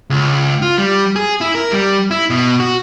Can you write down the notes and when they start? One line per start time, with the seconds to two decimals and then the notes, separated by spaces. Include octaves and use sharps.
0.10 C#2
0.62 F4
0.78 G3
1.16 G#4
1.41 E4
1.55 A#4
1.72 G3
2.11 E4
2.30 B2
2.60 F#4